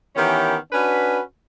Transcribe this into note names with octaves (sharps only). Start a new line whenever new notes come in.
D#3 E3 B3 C#4 G4 A#4
C#4 D4 F#4 B4